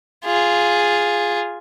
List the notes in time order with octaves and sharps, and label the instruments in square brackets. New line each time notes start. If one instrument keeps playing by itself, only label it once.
[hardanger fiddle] F4 G#4